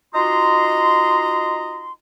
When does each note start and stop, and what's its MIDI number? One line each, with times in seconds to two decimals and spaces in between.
0.14 1.92 63
0.14 1.92 65
0.14 1.92 66
0.14 1.92 75
0.14 1.92 82
0.14 1.92 84